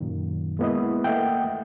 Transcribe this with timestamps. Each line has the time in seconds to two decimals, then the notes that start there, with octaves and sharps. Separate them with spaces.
0.01 F#2 A#2 D#3
0.59 G#3 A#3 B3 E4 B4 D#5
1.04 A3 A#3 D#5 E5 F#5 G5